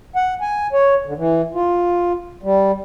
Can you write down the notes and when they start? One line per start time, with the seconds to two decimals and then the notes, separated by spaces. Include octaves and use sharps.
0.16 F#5
0.41 G#5
0.73 C#5
1.06 D3
1.17 E3
1.54 F4
2.43 G3